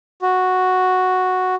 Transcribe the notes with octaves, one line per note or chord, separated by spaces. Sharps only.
F#4